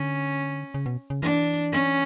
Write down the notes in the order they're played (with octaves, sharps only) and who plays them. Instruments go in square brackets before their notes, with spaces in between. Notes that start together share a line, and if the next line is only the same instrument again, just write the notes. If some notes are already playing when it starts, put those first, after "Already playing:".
Already playing: [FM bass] D3 [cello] C#4
[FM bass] C#3
B2
C#3
[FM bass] E3 [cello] D4
[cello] C#4